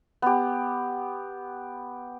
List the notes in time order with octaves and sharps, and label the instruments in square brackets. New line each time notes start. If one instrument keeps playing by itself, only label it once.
[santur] B3 G4